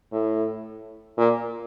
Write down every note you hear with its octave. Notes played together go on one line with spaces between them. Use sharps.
A2
A#2